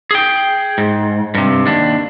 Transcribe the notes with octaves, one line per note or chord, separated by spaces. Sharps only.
G#4 G5
G#2
G2 C3
D#2 D4